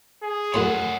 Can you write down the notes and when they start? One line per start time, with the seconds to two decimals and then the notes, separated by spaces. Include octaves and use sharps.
0.23 G#4
0.54 F#2 A2 C#5 E5 F#5 C6